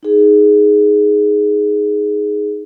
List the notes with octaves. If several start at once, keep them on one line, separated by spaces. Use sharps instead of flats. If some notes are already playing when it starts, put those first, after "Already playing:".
D#4 G#4